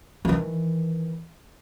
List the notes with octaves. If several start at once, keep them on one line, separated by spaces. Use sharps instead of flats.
D#3 E3